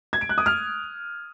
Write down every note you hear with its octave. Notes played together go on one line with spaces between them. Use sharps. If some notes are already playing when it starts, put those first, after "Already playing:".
G#6
D7
F#6
D#6
F6